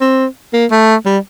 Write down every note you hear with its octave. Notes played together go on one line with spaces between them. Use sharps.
C4
A#3
A3
G3